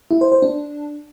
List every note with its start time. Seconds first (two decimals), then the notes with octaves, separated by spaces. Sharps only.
0.11 E4
0.21 C5
0.32 C5
0.42 D4